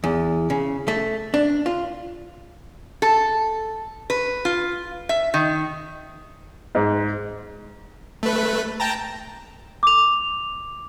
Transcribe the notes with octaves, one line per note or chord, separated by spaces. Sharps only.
E2
C#3
A3
D4
F4
A4
B4
F4
E5
D#3
G#2
A3 B4
G5 A5 A#5
D6 F7